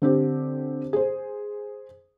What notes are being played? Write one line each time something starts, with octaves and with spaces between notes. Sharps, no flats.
D3 C4 G4
G#4 C5